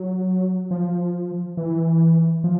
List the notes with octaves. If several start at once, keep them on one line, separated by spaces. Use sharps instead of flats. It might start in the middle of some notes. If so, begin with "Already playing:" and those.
Already playing: F#3
F3
E3
F3